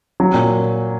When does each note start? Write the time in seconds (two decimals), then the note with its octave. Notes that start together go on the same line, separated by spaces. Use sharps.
0.20 F#3
0.34 A#2